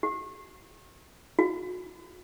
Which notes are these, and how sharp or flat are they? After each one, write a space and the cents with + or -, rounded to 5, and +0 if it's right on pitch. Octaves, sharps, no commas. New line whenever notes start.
F#4 +30
F#4 -35